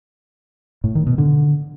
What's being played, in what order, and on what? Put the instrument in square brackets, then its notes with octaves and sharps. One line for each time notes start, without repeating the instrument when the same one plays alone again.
[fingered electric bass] A2
D#3
B2
D3